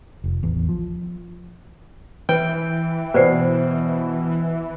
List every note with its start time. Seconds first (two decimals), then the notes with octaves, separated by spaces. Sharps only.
0.24 F1
0.43 A1 E2
0.69 F3
2.29 E3 B4 G5
3.14 B2 B4 C5 D5 C7